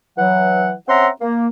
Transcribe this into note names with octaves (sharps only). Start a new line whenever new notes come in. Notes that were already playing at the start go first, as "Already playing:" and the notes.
E3 F#3 F#5
C4 C#4 E5 F#5 A#5 C6
A#3